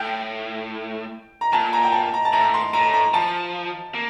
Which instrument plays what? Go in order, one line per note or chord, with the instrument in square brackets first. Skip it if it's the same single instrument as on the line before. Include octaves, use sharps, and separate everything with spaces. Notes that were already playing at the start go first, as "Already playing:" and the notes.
Already playing: [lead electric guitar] A2 [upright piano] G5
[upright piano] A#5
[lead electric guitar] A#2 [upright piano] A5
[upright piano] A#5
G5
A5
A#5
A5
[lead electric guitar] A2 [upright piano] A#5
[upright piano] C6
[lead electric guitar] A2 [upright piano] A#5
[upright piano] A#5
[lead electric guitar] F3 [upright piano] A5
[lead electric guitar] A#3